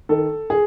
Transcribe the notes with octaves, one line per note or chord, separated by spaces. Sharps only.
D#3 A4
G#4